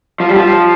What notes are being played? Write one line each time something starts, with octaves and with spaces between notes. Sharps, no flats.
F3
G3
F3